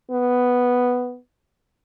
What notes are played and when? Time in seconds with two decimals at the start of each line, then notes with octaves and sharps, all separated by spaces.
0.11 B3